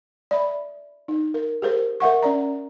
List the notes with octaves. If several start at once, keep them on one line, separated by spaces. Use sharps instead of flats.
D5 E5 B5
D#4
A#4
G4 G#4 A#4 C5
A#4 E5 F#5 C#6
C#4 D5 A#5